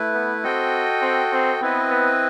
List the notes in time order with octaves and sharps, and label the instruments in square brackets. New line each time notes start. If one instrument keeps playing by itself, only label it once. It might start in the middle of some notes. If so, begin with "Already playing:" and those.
Already playing: [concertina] A3 E4 B4
[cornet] B3
[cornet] C4 [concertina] F#4 A4 D#5 G5
[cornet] C4
C4
[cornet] B3 [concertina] C4 E4 B4 D#5
[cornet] B3